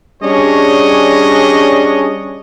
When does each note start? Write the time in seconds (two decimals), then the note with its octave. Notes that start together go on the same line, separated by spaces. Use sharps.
0.23 G3 C#4 D4 G#4 C#5 D#5